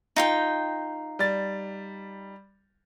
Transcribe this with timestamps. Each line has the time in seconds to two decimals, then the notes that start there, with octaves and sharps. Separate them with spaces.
0.16 D#4 F4 G5
1.19 G3 A6